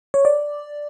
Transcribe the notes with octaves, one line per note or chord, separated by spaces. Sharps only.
C#5
D5